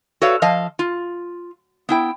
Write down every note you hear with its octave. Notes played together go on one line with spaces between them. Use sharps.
F#4 A4 B4 C#5 D5 F5
F3 D#5 F5 A5
F4
B3 E4 G5